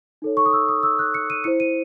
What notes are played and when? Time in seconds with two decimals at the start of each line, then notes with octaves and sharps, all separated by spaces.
0.22 D#4 A4 C#5
0.37 C#6
0.46 D#6
0.53 E6
0.69 D#6
0.83 E6
0.99 F#6
1.14 C#7
1.30 D#7
1.44 E4 C5 C#7
1.60 D#7